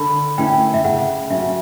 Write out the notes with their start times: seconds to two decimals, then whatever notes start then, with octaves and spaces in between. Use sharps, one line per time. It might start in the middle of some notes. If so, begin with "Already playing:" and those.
Already playing: D3 B5
0.38 A3 C#4 E4 G5
0.74 E5
0.84 C#3 F#5
1.30 F#3 C#4 E5